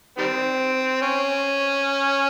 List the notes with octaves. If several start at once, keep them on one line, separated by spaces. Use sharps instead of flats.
D#3 G3 C4
C#4